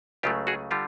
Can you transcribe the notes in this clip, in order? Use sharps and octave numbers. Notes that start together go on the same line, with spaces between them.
C#2 C#3 F#3 A3 F4 G4
F#4 G#4
D3 G3 F4 G4